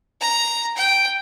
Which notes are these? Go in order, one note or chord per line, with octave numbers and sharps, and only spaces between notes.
A#5
G5